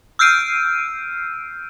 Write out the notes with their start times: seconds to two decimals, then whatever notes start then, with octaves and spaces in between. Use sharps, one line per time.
0.19 E6 F6 G6 C7 D7 D#7